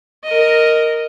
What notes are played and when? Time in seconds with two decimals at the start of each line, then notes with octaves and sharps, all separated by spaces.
0.24 A#4 D#5